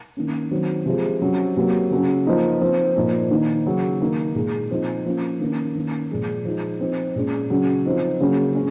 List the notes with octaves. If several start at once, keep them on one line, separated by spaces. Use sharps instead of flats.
D#3 A#3 C#4
D#3 F#3 C4
C3 F3 G#3
C3 F#3 C#4
C3 F#3 A#3
C#3 F#3 C#4
F3 A#3 D#4
F3 C4 D#4
A#2 F3 A#3 D#4
D#3 A#3 D#4
C#3 F#3 C#4
D#3 A#3 D#4
A#2 G#3 D#4
F3 C4 D#4
F3 A#3 C#4
D#3 A#3 C#4
D#3 A#3 C#4
A#2 F3 G#3
F3 G#3 D#4
F3 C4 D#4
A#2 G#3 C#4
C#3 F#3 C#4
F3 C4 D#4
C#3 F#3 A#3 C#4
G#3 C#4